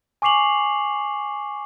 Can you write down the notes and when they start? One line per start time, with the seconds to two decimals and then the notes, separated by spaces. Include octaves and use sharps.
0.22 G#5 C#6 D6 C7 F7 F#7